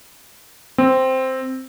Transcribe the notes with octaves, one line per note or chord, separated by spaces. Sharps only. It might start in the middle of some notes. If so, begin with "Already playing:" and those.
C4